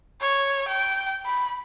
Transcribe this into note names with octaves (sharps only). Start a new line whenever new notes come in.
C#5
G5
B5